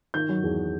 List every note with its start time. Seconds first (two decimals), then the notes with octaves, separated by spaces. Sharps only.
0.14 D#3 G6
0.29 F#3
0.43 E2